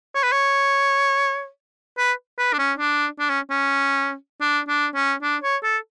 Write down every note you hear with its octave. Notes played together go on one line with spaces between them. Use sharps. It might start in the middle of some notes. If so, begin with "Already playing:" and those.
C#5
B4
C#5
B4
B4
D4
C#4
D4
D4
C#4
C#4
D4
D4
C#4
D4
C#5
A4